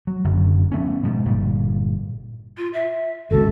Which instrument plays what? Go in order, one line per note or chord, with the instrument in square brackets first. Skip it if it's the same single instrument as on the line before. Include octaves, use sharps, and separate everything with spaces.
[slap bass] F#3
F#1 F#2 D3
F3 A3 B3 C#4
G#2 B2 F3
G1 A#2 G3
[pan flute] F4
E5
[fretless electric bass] G#1 C#2 [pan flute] F#4 [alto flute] A4